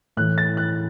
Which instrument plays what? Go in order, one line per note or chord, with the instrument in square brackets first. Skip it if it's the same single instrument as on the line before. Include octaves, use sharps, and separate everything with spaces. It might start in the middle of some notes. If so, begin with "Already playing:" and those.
[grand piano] A2 E3 F#6
A6
F#6